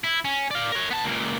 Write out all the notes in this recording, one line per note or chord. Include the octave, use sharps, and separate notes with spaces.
E4
C#4
D5 F5
A#4 C#5
B3 A5
C#2 A#2